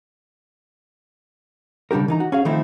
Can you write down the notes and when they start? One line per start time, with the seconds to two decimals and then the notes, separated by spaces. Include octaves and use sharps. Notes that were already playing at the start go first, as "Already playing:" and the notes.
1.91 C#3 G3 D4 G4 A#4
2.08 E3 D#4 A#5
2.20 F#4
2.32 C#4 G#4 F5
2.45 D#3 F3 A3 C4 D#4 E4